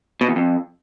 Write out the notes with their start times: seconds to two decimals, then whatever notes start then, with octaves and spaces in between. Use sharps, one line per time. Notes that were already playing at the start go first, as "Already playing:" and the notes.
0.21 B2
0.29 E2
0.36 F2